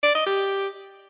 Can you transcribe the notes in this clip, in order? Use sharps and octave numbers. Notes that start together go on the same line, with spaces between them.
D5
D#5
G4